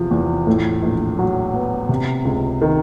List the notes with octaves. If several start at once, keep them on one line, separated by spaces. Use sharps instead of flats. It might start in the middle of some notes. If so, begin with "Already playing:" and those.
Already playing: E2 C3 F3
E2
A2
A#1
F#3
B3
C3
C#2
D#3